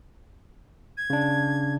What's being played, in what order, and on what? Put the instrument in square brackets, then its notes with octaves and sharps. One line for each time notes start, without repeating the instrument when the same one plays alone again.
[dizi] G#6
[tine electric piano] C#3 D4